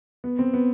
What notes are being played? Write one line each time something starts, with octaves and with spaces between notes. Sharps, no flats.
B3
C4
B3